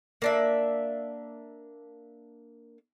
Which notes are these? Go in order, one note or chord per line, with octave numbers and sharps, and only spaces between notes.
A#3 D4 E5